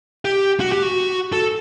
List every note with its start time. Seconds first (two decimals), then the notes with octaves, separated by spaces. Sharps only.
0.25 G4
0.60 F#4
0.72 G4
0.83 F#4
1.33 A4